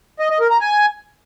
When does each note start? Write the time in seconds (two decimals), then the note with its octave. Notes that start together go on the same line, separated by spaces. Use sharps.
0.20 D#5
0.30 D#5
0.40 A#4
0.51 A#5
0.61 G#5